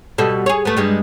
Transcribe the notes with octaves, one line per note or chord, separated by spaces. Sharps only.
B2 G3 A4
G#4 C#5
A3 B3
G2 G3 G#3